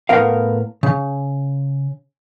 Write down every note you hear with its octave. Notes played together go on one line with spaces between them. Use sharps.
A2 B3 A#4 F5
C#3